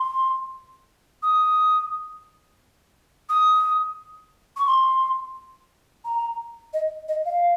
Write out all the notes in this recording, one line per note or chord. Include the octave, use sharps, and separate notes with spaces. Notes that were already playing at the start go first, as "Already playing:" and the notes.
Already playing: C6
D#6
D#6
C#6
C6
A#5
D#5
D#5
F5